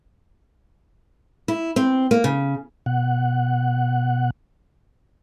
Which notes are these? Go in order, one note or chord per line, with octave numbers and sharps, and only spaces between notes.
E4
C4
A#3
C#3
B2 F#5